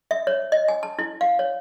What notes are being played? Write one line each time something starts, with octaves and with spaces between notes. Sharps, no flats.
E5
C#5
D#5
G#5
A5
E4
F5
C#5